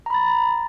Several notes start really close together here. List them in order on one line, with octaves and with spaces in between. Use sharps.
A#5 B5 A6